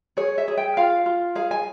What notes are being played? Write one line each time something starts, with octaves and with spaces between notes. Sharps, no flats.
G#4 C#5
E5
G#4
G5
F4 F5
F4
G#4 F5
G#5